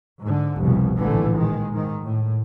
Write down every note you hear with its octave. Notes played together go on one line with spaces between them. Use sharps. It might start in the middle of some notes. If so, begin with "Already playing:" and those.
G#2 D3
F1 C2 B2
A1 A#2 D3 E3 A3
D#3 G#3
G#2 D#3
A2